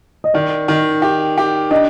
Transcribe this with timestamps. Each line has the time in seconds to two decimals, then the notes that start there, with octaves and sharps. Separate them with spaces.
0.24 D#5
0.34 D#3 D5
0.68 D#3
1.02 G4
1.37 G4
1.71 D4 D#5